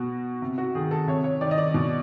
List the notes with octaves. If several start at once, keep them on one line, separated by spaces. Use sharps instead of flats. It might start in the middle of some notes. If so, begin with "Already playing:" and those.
Already playing: B2 F#4
C3
F#4
D#3 G#4
A4
C3 C#5
C#5
D#3 D5
D#5
D5
B2